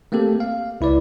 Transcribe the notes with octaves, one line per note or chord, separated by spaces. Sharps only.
A3 A#3 C4 G4 A4
F5
C#2 E4 B4 D5